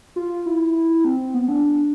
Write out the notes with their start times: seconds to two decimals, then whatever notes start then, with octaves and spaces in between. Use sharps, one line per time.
0.16 F4
0.46 E4
1.05 C4
1.34 B3
1.48 D4